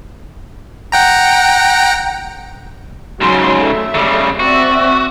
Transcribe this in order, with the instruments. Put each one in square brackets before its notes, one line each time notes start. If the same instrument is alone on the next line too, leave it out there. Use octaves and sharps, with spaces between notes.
[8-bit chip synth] F#5 G5 A#5
[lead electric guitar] G#2 C#3 [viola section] F#3 C6
[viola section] A3 E5
[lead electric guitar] C#3 G3
[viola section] C4 D5 E5 [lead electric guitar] F#4